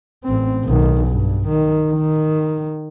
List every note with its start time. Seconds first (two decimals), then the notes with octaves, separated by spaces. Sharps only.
0.25 A1 C4
0.64 B1 D#3
1.07 G2
1.48 D#3
1.91 D#3